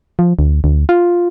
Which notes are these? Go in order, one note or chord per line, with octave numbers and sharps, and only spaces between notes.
F3
D2
D2
F4